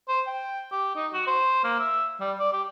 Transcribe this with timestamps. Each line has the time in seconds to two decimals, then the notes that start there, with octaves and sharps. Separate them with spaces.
0.08 C5
0.27 G5
0.72 G4
0.96 D#4
1.13 F#4
1.27 C5
1.64 A#3
1.79 E5
2.21 G3
2.39 D5
2.53 G4